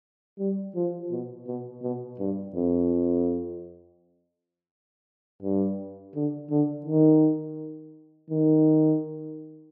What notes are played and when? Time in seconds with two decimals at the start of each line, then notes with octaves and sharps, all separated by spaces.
0.39 G3
0.75 F3
1.11 B2
1.47 B2
1.83 B2
2.19 G2
2.55 F2
5.43 G2
6.15 D3
6.51 D3
6.86 D#3
8.30 D#3